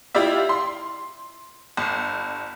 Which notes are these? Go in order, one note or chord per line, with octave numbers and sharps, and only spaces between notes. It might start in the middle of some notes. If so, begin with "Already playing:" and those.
E4 F4 G4 D5 E5
C6
G1